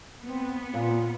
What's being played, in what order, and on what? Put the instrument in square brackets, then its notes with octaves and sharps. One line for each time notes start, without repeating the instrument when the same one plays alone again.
[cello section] B3 [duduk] C4
[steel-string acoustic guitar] A#2 [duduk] F4